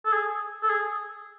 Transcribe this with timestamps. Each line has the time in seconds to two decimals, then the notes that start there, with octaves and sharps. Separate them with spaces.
0.05 A4
0.12 G#4
0.63 A4
0.69 G#4